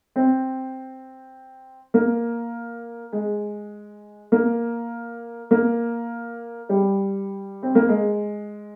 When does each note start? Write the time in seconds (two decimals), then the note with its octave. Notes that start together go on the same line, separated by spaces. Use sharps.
0.16 C4
1.94 A#3
3.13 G#3
4.32 A#3
5.51 A#3
6.69 G3
7.63 C4
7.75 A#3
7.89 G#3